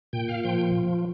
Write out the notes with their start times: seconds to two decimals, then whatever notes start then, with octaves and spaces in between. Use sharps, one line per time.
0.13 A#2 G5
0.28 F5
0.44 F3 G5